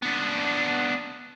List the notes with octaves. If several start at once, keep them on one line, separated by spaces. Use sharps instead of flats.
B3 D4